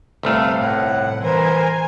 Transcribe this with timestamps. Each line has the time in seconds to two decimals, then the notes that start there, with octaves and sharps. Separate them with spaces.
0.23 G1 C2 A3 F5
0.61 A2 F#5
1.23 E3 A#4 C5 G#5